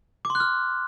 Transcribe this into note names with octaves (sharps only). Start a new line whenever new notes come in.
D6
C6
F#6
F6